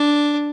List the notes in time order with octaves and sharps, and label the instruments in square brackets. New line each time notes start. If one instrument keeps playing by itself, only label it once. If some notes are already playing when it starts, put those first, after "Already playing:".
Already playing: [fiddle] D4